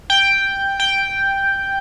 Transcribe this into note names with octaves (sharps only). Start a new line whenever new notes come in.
G5
G5